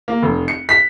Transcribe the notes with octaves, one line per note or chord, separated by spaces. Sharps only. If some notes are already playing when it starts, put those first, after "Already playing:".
A#3
F1
C#7
B6